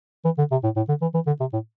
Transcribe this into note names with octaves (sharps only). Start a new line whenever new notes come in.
E3
D3
C3
A2
A2
D3
E3
E3
D3
C3
A2